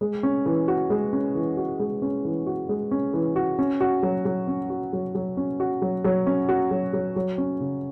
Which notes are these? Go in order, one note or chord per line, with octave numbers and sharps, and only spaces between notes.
G#3
C#4
E3
F#4
G#3
C#4
E3
F#4
G#3
C#4
E3
F#4
G#3
C#4
E3
F#4
C#4
F#4
F#3
F#3
C#4
F#4
F#3
F#3
C#4
F#4
F#3
F#3
C#4
F#4
F#3
F#3
F#3
C#4
C#3